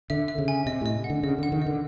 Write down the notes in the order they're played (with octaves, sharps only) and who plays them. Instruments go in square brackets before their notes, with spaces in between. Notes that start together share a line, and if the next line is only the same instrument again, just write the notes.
[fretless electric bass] D3 [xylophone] E5
[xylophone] E5
[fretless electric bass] C#3
[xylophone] G#5
[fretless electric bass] C3 [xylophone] D#5
[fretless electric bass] A2 [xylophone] D#5
[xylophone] F#5
[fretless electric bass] D3
[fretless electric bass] C#3 [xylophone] D#5
[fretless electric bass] D3 [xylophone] F#5
[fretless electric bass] D#3
[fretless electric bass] D3 [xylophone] D#5